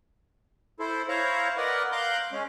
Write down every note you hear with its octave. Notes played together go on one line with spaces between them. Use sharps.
E4 A4 C5
E4 C5 C#5 F5 A#5 C#6
A#4 B4 D5 D#5 F#5
F5 A#5 C6 D6 F#6 G6
G#3 C#4